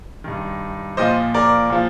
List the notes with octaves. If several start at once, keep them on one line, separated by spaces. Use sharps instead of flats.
G2 D#3
A#2 F3 C5 D#5
A#4 D5
A#2 F3